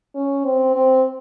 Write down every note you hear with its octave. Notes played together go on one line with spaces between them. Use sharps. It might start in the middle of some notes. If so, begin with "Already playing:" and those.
C#4
C4
C4